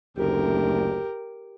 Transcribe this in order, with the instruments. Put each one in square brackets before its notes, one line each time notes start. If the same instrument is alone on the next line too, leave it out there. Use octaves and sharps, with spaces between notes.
[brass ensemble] F#1 D2 [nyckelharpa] G4 A#4